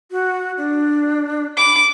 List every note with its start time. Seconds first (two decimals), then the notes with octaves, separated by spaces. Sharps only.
0.11 F#4
0.58 D4
1.57 B5 D6